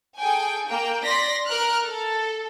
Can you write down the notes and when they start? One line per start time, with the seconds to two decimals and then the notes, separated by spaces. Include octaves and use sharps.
0.18 G#4 A4 G5 G#5
0.68 A#3 G5
1.03 D5 C6 A#6 B6
1.46 A#4 F6 F#6
1.85 A4